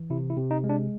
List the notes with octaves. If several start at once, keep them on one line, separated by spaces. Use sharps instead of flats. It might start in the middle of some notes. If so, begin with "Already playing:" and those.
Already playing: E3
C3 E4
E4
C3
D#4
G#3
D4